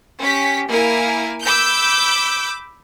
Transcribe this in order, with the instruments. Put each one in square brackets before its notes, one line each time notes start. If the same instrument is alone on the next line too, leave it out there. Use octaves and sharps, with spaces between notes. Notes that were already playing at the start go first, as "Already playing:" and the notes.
[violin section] C#4 G4 B6
A#3 E4 A#4 G#5
B5 D6 E6 G6